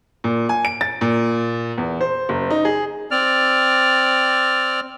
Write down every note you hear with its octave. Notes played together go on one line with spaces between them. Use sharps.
A#2
G#5
D7
A6
A#2
E2
C5
F#1
D#4
G#4
C4 D5 F6